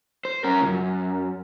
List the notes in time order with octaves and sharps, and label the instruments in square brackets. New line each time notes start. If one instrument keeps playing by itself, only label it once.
[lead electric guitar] C5
C#4 A#4
C#2 F#2